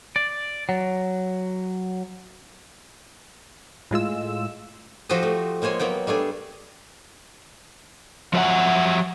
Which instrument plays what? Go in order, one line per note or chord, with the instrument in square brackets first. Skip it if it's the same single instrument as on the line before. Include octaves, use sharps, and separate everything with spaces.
[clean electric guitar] D5
F#3
[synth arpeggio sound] A2 G#3 F4 E6
[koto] F3 F#4 G4 A4 C5 D#5
A3
G#3 A#3 C5 C#5 G#5
F#3 A#3 B3 G5
G3 A3 D4 G#4
[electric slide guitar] F3 F#3 C5 D5 E5 F#5